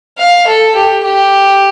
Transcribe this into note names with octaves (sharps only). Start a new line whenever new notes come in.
F5
A4
G4
G4